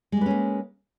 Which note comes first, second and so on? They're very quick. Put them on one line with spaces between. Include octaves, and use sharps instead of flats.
G#3 G3 B4 C#4 A#3